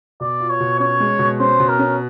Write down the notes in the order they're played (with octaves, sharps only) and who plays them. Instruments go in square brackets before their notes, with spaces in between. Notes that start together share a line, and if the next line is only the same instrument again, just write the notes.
[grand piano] B2 [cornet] D5
[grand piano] F4
[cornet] C#5
[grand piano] B2
[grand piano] C#4 [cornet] C#5
[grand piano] G#3
B2
[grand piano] C#4 [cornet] C5
[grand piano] B2
[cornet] A#4
[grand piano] C#4